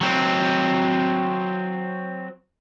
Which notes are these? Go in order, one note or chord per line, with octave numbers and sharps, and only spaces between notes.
F#3 C4